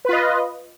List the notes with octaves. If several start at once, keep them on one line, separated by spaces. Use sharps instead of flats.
F4 B4 D#5